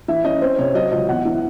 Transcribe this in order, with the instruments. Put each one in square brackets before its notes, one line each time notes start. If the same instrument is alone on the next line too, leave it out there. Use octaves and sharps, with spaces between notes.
[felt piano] E3 E5
C#4 D#5
C4 C5
C3 C#5
F#3 D#5
C#2 D#5
E2 F#5
E3